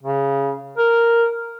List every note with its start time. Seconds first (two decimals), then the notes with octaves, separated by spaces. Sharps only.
0.03 C#3
0.78 A#4